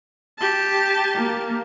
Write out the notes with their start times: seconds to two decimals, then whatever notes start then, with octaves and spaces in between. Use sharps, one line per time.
0.39 G4 A5
1.14 A#3